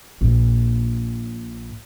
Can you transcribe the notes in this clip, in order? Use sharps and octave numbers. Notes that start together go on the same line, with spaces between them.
A#1 A#2